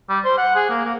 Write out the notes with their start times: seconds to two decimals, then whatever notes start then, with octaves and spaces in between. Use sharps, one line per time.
0.10 G3
0.25 C5
0.38 F#5
0.56 G#4
0.69 A#3
0.85 A#3